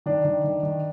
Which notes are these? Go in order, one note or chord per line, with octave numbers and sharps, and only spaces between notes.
D#3 D4
D#3
D#3
D#3